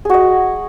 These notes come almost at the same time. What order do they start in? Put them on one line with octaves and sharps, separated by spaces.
G#4 F#4 D#5